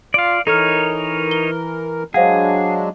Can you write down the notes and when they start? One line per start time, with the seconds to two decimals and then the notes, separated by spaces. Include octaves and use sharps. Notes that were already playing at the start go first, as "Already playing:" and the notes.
0.14 F4 D5 F5
0.47 E3 D#4 A4 A#4 C#5 F6
1.31 G7
2.14 F#3 G#3 D4 G#4 C5 F5 F#5